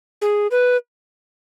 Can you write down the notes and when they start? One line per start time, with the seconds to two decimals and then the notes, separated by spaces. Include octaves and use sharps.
0.22 G#4
0.51 B4